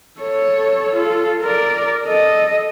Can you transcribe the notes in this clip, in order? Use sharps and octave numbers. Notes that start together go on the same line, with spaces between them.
A4 C#5
F4 A4
A#4 D5
A4 D#5